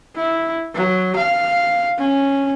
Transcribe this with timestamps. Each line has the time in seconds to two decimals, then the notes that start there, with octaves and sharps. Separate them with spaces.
0.16 E4
0.75 F#3
1.16 F5
1.98 C#4